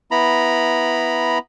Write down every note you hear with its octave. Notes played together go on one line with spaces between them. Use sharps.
B3 E4 A#5 B5